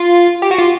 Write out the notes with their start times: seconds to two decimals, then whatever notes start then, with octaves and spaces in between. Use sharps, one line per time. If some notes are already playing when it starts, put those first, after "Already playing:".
Already playing: F4
0.42 G4
0.51 F#4
0.58 F4